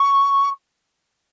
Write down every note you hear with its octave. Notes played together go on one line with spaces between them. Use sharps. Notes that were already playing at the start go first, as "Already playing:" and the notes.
Already playing: C#6